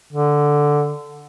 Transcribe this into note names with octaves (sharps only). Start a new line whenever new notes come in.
D3